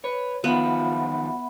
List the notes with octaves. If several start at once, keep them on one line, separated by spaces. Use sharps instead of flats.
B4 C#5
D#3 F3 F#3 B3 F4 E5 F#5 B5